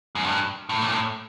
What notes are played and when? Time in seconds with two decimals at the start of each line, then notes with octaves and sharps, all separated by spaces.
0.15 F#2
0.24 G2
0.69 A2
0.82 A#2
0.92 A2